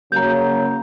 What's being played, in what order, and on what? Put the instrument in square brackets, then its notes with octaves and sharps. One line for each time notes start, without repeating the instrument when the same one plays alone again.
[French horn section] C#3 F#3 A#3 [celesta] A#5 G6